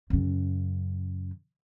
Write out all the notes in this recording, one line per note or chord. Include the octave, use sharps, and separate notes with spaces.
F#2 C#3